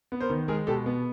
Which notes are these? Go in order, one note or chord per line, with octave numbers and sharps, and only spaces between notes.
B3
A#4 C5
D#3
G#3 G#4 A#4
B2 G4 A4
B3